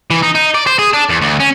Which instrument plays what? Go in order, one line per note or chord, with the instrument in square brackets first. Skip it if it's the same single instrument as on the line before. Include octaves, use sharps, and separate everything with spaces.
[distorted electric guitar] E3
D#4
D#4
D5
C5
G#4
D4
E2
D2
C#4